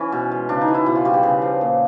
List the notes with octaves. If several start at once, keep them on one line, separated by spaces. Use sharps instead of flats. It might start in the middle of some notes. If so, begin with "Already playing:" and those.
Already playing: E3 C#4
B2
G#3
C#3 D4
D#4
E3
E4
B2 E4
F4
G3 F#4
G4
C#3 G#4
F3
A#2